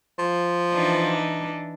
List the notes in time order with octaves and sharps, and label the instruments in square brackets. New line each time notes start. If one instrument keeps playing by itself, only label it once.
[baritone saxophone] F3
[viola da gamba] E3 D4 D#4